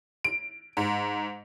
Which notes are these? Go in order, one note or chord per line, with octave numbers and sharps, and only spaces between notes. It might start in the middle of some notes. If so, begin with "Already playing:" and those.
D7
G#2